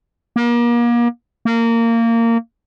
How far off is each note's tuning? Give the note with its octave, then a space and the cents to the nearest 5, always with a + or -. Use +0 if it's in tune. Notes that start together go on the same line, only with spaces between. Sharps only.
A#3 +35
A#3 -20